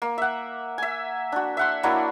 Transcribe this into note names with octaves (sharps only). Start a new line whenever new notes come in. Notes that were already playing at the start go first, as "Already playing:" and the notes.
A#3
E5 F#5
E5 G#5
D4 F#4
E5 F#5 C6
F#3 A#3 D4 E4